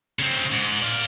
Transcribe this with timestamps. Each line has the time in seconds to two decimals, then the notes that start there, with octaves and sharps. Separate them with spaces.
0.19 C#3 C4
0.52 G#2
0.82 D5 F5